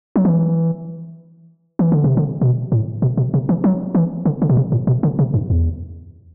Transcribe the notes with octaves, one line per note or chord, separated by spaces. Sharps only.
F#3
E3
E3
D3
C3
D3
B2
A2
B2
B2
C3
E3
F#3
E3
D3
D3
B2
C3
A2
B2
D3
C3
G2
E2